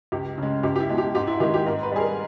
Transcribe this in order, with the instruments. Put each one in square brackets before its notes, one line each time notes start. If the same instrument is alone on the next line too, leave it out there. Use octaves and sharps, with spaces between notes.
[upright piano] C#2 G4
C#3 G#3
C#2 G4
G4
E4
B2 G#3
G4
G#2 G4
E4
D#3 G#3 G4
G4
G#2 A#4
B4
G3 G#4
A#4